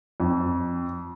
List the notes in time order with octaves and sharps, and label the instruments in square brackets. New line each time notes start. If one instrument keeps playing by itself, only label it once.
[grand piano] F2